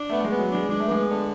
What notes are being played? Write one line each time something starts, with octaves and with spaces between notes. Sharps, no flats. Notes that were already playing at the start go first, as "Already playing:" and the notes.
Already playing: D4
A3 B3
A3
G#3 B3
F#3
D4
G#3
G#3 D4
A3
G#3 B3
D3